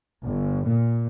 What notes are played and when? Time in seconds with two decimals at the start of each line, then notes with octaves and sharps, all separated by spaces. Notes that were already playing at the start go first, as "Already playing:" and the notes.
0.24 G1
0.67 A#2